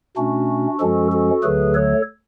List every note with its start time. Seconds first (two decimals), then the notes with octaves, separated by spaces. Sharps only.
0.17 B2 A3 C#4 D4 F#4
0.80 F#2 F3 G#3 C#4 F#4 A4
1.12 F#4 A4
1.43 D2 D3 F#3 A3 G#4 B4
1.74 A4 C#5